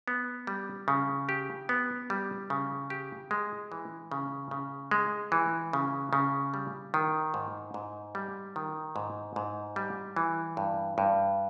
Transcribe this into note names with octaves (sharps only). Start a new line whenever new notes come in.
B3
G3
C#3
G4
B3
G3
C#3
G4
G#3
E3
C#3
C#3
G#3
E3
C#3
C#3
G3
D#3
G#2
G#2
G3
D#3
G#2
G#2
G3
E3
G2
G2